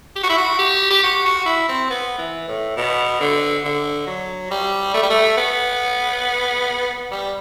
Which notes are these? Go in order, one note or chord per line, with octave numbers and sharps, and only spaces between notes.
G4
F#4
E4
F#4
G4
G4
F#4
F#4
E4
C4
B3
E3
A2
B2
D3
D3
F#3
G3
A3
G3
A3
B3
G3